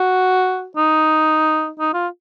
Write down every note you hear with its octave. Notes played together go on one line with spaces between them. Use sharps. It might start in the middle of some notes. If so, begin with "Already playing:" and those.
Already playing: F#4
D#4
D#4
F4